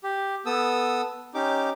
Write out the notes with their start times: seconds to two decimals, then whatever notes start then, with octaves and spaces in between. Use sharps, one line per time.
0.03 G4
0.46 B3 A4 D#6 E6
1.34 C#4 D#4 G4 D6